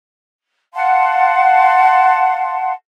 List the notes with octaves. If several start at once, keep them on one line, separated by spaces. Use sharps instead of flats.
F5 F#5 A5 C6